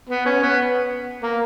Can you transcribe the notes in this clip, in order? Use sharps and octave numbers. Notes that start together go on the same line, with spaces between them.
B3
C#4
B3
A#3